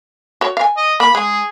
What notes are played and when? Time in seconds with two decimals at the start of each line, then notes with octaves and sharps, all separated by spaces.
0.41 F#4 C#5
0.57 F5 G#5
0.77 D#5
1.00 A#3 B5
1.15 G#3 G#4